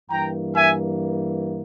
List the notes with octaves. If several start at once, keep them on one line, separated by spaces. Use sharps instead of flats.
G2 E3 A#3 G5 A#5
E5 G#5